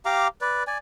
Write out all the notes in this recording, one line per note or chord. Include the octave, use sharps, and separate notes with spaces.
G4 F5 A#5 D6
B4 D5
D5 G#5